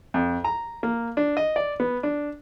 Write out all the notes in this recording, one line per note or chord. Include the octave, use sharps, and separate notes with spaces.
F2
A#5
A#3
D4
D#5
D5
B3
D4